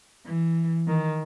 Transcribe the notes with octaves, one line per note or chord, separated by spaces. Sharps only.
E3
D#3